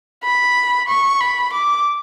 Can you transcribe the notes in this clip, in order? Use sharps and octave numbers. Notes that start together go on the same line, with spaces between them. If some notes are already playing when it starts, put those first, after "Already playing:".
B5
C#6
B5
D6